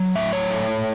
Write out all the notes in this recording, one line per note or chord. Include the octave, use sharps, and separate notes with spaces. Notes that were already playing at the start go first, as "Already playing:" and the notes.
Already playing: F#3
A2 E5
C#5
A3